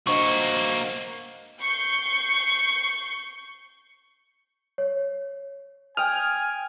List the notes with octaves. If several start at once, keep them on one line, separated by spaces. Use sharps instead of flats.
A#3 D4 F#4 C5 D#5 C#6
C#6 G6 C7
C#5
G5 G#5 D#6 F6